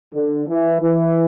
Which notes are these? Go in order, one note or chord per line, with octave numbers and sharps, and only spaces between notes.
D3
E3
E3